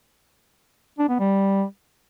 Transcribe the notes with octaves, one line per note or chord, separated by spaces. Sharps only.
D4
B3
G3